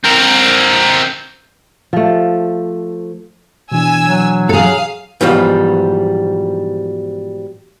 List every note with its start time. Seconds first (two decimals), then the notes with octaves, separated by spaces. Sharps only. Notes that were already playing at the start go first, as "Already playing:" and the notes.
0.04 C4 A#4
1.93 F3 A3
3.72 B2 E3 D4 G#5 E6
4.04 F#3
4.49 G#4 A4 F5
5.21 G#2 B2 E3 F3 G3